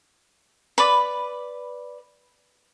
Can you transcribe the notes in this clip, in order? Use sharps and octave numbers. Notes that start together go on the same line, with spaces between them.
B4 D5 B5